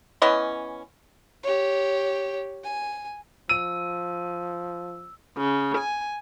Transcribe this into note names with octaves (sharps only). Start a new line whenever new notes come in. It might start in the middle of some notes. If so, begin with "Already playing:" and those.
E3 B3 C#4 D#5
G4 C#5
G#5
F3 E6 D#7
C#3
G#5